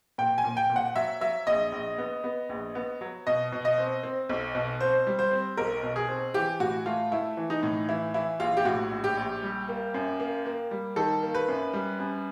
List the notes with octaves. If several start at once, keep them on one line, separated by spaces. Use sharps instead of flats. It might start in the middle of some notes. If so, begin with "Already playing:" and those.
A#2 G5
G#5
A#2
G5
A#2
F#5
F#3 E5
F#3 E5
A#1 D#5
A#1
B3
B3
A#1
B3
F#3
B2 D#5
B2
D#5
C4
C4
B1
B2
C4 C5
G3
C5
C4
B1 A#4
B2
G#4
C4
E3 G4
A2 F#4
A3 F4
A3 E4
E3
D#4
A2
E3 E4
E3 E4
A#1 F4
G4
A2 F#4
A#1
G4
A#1
G3
A#3
F#2
A#3
A#3
G3
D#3 A4
A#3
B4
F#2
G3
F#2